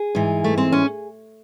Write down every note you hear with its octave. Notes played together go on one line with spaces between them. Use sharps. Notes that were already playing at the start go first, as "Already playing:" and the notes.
Already playing: G#4
G#2 E3
A3
C4
C#4